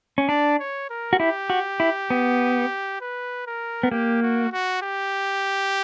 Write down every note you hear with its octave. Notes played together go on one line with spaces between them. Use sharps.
C#4
D4 D5
C#5
A#4
F#4
E4 G4
F#4
E4
B3
B4
A#4
B3
A#3 G4
F#4
F#4
G4